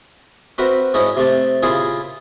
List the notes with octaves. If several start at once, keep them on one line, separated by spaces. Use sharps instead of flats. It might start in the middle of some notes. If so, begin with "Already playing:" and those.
C4 F#4 A#4 B4 E5
G#2 C#4 D#4 E4
C3 A3 A4
A#2 C#3 E4 F4 G#4